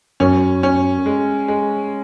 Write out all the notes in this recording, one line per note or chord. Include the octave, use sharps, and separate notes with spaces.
F#2 C#4
C#4
G#3
G#3